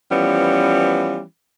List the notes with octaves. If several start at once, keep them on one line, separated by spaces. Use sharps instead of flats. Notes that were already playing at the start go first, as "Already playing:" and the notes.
E3 F3 G3 B3 C#4